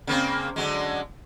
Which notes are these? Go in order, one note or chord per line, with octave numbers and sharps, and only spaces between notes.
C#3 A#3 C4
D3 F#3 G#3